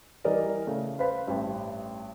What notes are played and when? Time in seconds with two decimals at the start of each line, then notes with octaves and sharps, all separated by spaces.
0.24 E3 G3 A#4 D5 D#5
0.67 C#3 A3
0.99 B4 C5 F5 B5 B6
1.28 A1 G2